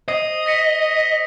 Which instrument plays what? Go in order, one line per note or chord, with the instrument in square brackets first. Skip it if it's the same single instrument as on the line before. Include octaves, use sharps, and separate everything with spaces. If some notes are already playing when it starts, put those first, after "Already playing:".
[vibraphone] C5 [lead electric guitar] D#5 [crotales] D#6
[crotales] A#6 B6 C#7